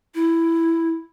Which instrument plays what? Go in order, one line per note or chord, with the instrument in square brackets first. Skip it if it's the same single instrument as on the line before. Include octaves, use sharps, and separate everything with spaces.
[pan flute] E4